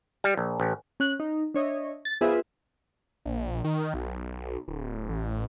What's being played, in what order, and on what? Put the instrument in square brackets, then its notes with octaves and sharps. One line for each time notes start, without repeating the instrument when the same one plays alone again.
[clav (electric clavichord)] G3
A#1
A1
[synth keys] C#4 F#6
D#4
D4 C#5 D#5 E5
A6
B3 F4 G#4 B4 C5 E5
[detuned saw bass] A#1
D#3
B1
D1
A1